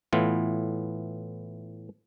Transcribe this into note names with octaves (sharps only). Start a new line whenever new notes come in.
A2 E3 B3 F4